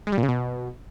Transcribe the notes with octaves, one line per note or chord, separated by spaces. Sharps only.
G#3
G3
A#2
C#3
B2